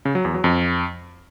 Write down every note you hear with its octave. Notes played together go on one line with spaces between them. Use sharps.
C#3
F#3
E2
F#3
F2